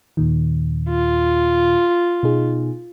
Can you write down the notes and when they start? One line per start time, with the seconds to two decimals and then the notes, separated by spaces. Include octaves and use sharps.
0.17 D#2 A#2 D#3
0.89 F4
2.23 B2 D#4 G#4